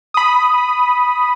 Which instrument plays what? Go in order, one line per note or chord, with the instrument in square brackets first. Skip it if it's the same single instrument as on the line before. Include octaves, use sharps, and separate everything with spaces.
[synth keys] B5 D#6